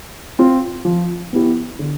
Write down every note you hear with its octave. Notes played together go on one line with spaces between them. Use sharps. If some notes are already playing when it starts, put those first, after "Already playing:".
C4 F4
F3
B3 E4 G4
D3